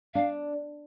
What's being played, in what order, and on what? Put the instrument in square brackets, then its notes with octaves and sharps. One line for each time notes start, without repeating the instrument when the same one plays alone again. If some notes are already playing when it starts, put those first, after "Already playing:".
[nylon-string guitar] D4 [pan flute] F5